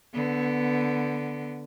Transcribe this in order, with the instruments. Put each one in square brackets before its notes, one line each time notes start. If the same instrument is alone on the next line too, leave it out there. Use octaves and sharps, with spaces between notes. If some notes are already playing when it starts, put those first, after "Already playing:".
[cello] D3 B3